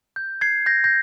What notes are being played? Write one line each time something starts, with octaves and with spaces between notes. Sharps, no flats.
G6
G#6 C7
G6 A#6
G6 A#6